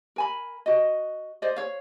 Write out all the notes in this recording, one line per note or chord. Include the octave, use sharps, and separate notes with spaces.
A#4 G#5 B5
F#4 D#5
C5 D5 D#5
C#5 F5